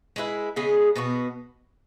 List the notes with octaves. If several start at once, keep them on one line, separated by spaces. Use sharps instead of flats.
G#3 E4 B4
C#3 G#3 B3 G#4
B2 B3 F#4